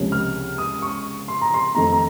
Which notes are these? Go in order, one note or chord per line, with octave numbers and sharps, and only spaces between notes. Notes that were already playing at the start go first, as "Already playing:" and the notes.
Already playing: C#2 C3 F3 A#3 C#4
F6
D#6
C#6
C6
A#5
C6
F2 D#3 A3 A#5
A#5